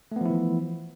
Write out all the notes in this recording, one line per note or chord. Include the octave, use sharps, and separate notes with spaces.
E3 F3 A3 B3 E4